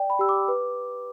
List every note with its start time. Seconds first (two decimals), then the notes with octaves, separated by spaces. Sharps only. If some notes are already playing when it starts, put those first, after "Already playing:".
Already playing: D5 G5
0.10 B5
0.19 G4 E6
0.29 D6
0.48 B4